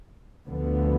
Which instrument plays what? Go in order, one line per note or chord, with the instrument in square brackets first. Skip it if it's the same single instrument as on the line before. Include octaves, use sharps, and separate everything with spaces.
[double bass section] D2 D3 F3 B3